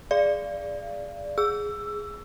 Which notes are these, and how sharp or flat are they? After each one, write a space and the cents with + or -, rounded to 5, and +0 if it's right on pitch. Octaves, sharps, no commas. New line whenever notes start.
G#4 +0 D5 +0 F5 -25
G#4 +0 E6 +15